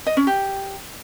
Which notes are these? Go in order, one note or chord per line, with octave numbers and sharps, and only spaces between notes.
D#5
C#4
G4